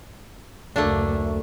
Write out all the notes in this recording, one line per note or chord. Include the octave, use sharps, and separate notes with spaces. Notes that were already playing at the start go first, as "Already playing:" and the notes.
F#1 D2 A3 A#3 D4